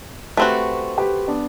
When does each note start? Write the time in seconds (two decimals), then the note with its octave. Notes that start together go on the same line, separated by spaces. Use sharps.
0.37 A3 C4 F#4 G4 B4
0.98 G4 B4
1.28 B3 D4